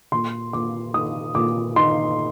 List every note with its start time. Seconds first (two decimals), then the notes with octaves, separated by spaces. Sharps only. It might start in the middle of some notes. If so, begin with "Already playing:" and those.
0.12 A#2 C6
0.53 A#2 D6
0.94 D#4 D#6
1.35 A#2 D6
1.76 D#4 C6